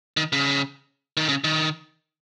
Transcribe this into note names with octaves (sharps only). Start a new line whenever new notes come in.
D#3
C#3
D#3
C#3
D#3